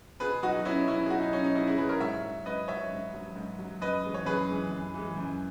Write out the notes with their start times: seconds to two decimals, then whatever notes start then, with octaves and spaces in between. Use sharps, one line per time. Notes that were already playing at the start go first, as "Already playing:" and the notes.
0.20 B2 G#4 B4
0.43 F#3 D#4 F#4
0.65 B2 C#4 E4
0.88 F#3 C#4 E4
1.06 G#4
1.10 B2 D#4 F#4
1.22 D#4
1.33 F#3 C#4
1.44 D#4
1.55 B2 C#4 E4
1.67 E4 G#4
1.78 F#3 G#4 B4
1.89 A#4 C#5
2.00 G#2 C#5 E5
2.23 F#3
2.46 G#2 B4 D#5
2.68 F#3 C#5 E5
2.91 G#2
3.14 F#3
3.36 G#2
3.59 F#3
3.81 F#2 B4 D#5
4.04 E3 G#3
4.14 C#5
4.26 F#2 G#4 B4
4.49 E3 G#3
4.71 F#2
4.94 E3 G#3
5.16 F#2